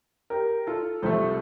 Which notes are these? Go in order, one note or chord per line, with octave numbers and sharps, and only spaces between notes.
G4 A#4
F4 A4
C2 C3 F3 A3 A4 C5